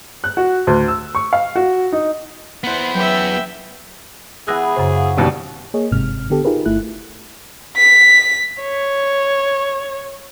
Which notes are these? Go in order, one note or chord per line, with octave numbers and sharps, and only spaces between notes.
F#6
F#4
D2
E6
C#6
F5
F#4
D#4
B3 E4 C5 F#5
F#3 C#4 B4 E5 G5
E3 B3 G#4 E6 F#6 A#6
F#2 C#3 F#4 C5
F5
D#2 B2 D3 E3 G3
A#3 G#4 C#5 D#5
G1 G#2 C3 F6
D3 B3 G4 A4
D#4 F4 G4 G#4 A#4 B4
G1 A3 E4 F#6
B6
C#5